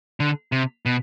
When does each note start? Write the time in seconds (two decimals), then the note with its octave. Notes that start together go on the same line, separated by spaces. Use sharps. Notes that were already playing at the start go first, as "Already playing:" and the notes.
0.20 D3
0.52 C3
0.86 B2